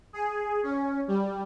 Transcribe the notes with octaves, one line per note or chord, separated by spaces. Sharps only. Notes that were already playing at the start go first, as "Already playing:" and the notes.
G#4
C#4
G3